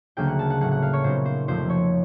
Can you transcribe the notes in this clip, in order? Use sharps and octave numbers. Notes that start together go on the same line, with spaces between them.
D2 C#3 F#3 A#3 G5
F#5
A5
F#5
A2 F#3 A#3 F#5
F#5
F5
C#5
A#2 F#3 B3 D#4 C5
C5
F2 C3 F3 A3 C5
C#5